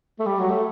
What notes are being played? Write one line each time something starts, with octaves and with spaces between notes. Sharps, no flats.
A3
G3
F#3
A3